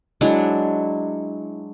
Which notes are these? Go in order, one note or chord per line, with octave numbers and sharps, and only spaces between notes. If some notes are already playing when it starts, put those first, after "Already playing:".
F#3 G#3 D4 E4